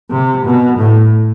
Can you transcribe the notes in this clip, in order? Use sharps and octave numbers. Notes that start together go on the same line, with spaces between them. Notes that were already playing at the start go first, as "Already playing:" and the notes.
C3
B2
A2